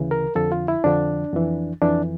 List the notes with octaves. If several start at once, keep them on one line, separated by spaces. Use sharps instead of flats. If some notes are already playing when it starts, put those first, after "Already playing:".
Already playing: D2 C#3 E3
A#4
F2 D3 F3 A4
F4
E4
F2 D3 F3 D4
F2 E3
F2 E3 D4